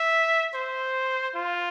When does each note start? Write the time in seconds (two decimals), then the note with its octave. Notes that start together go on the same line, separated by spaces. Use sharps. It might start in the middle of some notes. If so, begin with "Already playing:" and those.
Already playing: E5
0.54 C5
1.35 F4